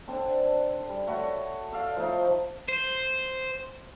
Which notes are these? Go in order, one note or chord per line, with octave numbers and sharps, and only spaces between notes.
D3 C4 D4
G3
A3 F#4 C#5 B5
A4 D5 F5
F3 A3 D#4
C5